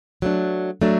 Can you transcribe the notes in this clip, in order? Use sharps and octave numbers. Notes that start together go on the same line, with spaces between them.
F#3 A3 D4
F#3 A3 D4